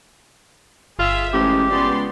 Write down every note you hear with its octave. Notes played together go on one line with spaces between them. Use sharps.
G1 F4 G#4 E5
A1 G#3 G4 C5
C#2 B3 D5 C6